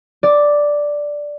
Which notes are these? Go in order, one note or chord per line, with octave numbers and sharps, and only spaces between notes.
D5